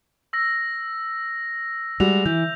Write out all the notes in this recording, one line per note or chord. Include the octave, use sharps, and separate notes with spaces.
E6 A#6
G3 G#3 F#4 F7
E3 G6